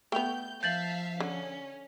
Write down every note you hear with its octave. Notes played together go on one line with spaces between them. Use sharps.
A3 B3 G5 G6 F7
F3 E5 F5 A5 G6 A6 F#7
D3 C#4